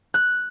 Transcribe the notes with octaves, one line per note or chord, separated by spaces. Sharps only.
F#6